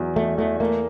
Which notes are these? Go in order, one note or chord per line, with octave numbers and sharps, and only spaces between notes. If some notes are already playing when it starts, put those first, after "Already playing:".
Already playing: E2 F#3
E2 A3
E2 A3
A3 A#3